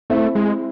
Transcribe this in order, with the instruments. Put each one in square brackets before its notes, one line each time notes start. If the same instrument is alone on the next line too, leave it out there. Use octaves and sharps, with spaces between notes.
[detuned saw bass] A3 [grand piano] C4 E4 C5 E5
[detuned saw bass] G#3